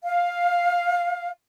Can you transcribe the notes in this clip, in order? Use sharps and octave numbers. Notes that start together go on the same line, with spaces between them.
F5